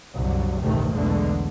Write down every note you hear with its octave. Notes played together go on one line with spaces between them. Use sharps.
C2 F#2 D3 F#3
A1 D2 G2 C3 D#3 A3
B1 E2 B2 D3 G#3 A3